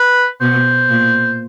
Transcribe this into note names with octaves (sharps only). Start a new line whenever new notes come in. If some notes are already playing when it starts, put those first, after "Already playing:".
Already playing: B4
B2 C5
A#2